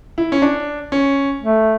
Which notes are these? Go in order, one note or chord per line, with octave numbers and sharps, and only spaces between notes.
E4
C#4
D4
C#4
A3